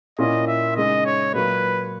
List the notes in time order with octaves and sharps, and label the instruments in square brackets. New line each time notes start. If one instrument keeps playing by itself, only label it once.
[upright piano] A#2 A#3 C#4 E4 [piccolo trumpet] D#5
[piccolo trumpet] E5
[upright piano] C#3 G#3 D#4 [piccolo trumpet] D#5
[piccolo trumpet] C#5
[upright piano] A#2 F#3 A#3 [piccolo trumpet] B4